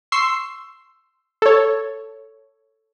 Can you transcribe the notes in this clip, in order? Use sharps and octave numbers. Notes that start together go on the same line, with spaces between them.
C6 C#6 E6 C7
A4 C#5